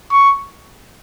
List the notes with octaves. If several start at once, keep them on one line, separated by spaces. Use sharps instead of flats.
C#6